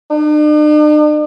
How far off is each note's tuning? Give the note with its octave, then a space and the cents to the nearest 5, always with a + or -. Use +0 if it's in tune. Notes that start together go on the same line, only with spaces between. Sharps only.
D4 +45